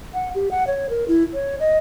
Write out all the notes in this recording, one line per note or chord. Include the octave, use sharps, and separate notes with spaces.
F#5
G4
F#5
C#5
A#4
E4
C#5
D#5